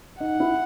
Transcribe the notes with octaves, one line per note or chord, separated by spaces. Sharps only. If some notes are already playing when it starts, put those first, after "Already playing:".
D#4 F#5
E4